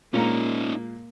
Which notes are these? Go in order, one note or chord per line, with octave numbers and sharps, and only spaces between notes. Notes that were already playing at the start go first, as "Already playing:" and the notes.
A#2 G#3 A#3 C#4 D#4 A#5